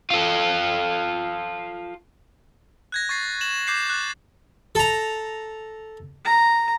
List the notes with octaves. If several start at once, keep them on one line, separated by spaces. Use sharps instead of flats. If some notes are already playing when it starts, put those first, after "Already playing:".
F4 A4
F#6 G#6 A#6
C#6 A6 C7
E7 F#7
D6 G6 C7 E7
F#6 A6
A4 A#5
A#5